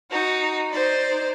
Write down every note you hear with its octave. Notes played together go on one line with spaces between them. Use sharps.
D#4 F#4
D#4 C5 D5